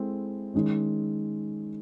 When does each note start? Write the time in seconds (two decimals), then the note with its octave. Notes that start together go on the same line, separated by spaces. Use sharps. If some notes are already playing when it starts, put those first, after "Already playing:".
Already playing: G#3 C4 E4 A4
0.54 D#3 G#3 C#4